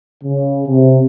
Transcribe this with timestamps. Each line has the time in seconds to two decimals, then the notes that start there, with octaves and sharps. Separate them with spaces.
0.24 C#3
0.67 C3